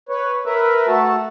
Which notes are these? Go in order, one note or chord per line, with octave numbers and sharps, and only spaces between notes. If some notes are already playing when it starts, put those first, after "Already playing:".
B4 C#5
A#4 B4 E5
A3 F#4 A4 A5